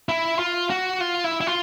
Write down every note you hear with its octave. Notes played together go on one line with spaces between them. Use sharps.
E4
F4
F#4
F4
E4
E4
F4